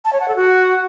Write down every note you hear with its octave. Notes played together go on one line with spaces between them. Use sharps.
A5
C#5
F#5
A4
F#4